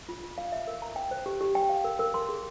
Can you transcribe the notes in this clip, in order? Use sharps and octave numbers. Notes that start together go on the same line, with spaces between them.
F4
F4
F5
E5
A#4
A#5
G5
C5
G4
G4
G5
F5
A#4
A#4
C6
G#4